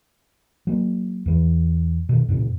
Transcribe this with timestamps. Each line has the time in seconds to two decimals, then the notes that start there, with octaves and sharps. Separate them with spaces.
0.67 F#3 A#3
1.26 E2 E3
2.09 B2 D#3
2.28 F#2 A#2 C#3